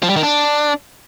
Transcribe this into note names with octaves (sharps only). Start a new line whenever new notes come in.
F3
G3
D#3
D4